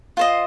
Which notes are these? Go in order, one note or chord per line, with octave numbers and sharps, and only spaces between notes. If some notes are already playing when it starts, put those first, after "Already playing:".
F4 C5 D#5